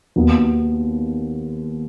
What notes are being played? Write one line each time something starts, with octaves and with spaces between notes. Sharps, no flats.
D#2 D#3 B3 D#4 F#4